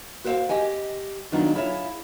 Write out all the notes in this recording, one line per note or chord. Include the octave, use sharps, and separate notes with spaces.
F#4 B4 C5 E5 F5 G5
G4 D#5 G5 G#5
D#3 F#3 B3 D4 D#4 F4
E4 F4 G#4 C#5 E5